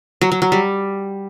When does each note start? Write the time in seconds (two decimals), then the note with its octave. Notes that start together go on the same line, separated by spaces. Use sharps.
0.21 F#3
0.32 F#3
0.42 F#3
0.52 G3